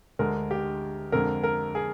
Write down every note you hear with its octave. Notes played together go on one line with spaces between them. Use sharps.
D2 D3 G#3 A#4
G4
F2 D3 G#3 A#4
A#4
G#4